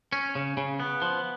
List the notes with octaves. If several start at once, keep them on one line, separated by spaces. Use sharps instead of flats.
C#4
C#3
C#3
B3
F3